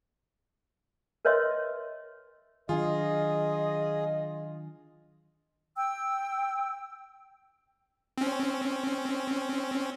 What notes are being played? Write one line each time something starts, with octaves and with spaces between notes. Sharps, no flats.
A#4 B4 C#5 D#5 E5 C6
D#3 F#3 D4 F4 G#4 D#5
G5 E6
C4 C#4